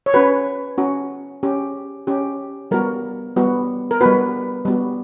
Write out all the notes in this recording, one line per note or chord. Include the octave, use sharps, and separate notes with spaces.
C#5
C#4 F#4 B4
C#4 F#4
C#4 G4
C#4 G4
G3 B3 F#4 A#4
G3 B3 F#4
A#4
G3 B3 F#4 B4
G3 B3 F#4